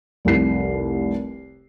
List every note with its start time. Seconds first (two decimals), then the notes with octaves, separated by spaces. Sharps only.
0.25 F1 C2 C7